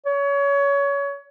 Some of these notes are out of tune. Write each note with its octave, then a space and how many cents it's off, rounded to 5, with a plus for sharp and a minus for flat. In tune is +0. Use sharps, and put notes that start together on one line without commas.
C#5 +25